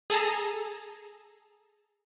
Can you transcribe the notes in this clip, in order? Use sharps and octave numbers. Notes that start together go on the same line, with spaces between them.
G#4 A4 A5 A#5